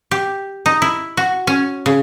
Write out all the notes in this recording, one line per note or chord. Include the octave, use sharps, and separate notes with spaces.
G4
D#4
E4
F#4
C#4
C#3